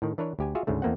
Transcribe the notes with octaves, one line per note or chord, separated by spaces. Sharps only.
A2 D#3
E3 D4 A#4 B4 C#5
D2 G4 G#5
F4 F#4 G#4 E5 F5
D2 G#2 C#3 A3
E2 A3 A#3 C4 F#5